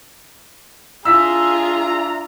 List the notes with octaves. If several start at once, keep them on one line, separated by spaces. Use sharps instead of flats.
D4 F4 G#4 E5 A#5 E6 B6